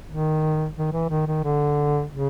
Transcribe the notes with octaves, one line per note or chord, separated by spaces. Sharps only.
D#3
D#3
E3
D#3
D#3
D3
C#3